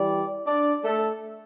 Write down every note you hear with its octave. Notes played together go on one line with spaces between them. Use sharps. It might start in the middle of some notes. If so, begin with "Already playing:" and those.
Already playing: E3 G3 D5
D4 D5
A3 A4